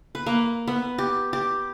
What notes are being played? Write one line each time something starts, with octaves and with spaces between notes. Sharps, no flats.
B4
A#3
B3
G4
G4